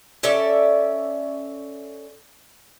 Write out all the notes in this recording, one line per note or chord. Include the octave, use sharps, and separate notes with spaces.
C#4 A4 D5 E5